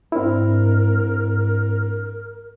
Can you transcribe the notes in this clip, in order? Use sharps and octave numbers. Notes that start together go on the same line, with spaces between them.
G#2 C4 D4 E4 A#4